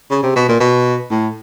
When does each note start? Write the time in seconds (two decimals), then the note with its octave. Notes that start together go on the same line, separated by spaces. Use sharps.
0.11 C#3
0.23 C3
0.36 B2
0.49 A#2
0.60 B2
1.11 A2